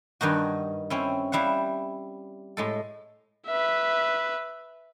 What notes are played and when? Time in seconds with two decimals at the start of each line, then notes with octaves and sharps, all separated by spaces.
0.21 G2 D#3 D#4 F#4
0.90 C4 C#4 E4
1.32 G3 E4 F5 F#5
2.57 A2 G#3 A4
3.47 B4 E5